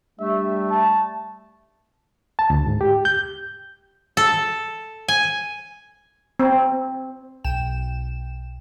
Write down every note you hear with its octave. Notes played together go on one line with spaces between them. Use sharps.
G3 A3 D4 E5
A5
A5
D2
G#2
G4
G6
A4
G#5
C4
B1 G5 E7